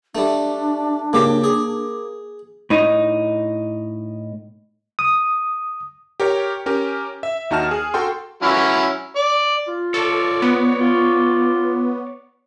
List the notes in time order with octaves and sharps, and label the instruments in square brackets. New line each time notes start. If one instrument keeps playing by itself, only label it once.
[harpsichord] G3 A3 [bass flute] D4
[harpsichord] C#3 G4 [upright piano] A#3 D6
[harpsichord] G#4
[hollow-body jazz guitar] A2 D#4
[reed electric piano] D#6
[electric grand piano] G4 A#4 C#5 G5
C#4 G4 A#4
E5
D#2 D#4 F#4 A5 F6 E7
G#4
F#4 A4 G5 C6
[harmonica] F#3 C#4 E4
D5
[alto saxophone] F4
[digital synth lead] A4 [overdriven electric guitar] C#5 D5
[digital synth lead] B3
[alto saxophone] F4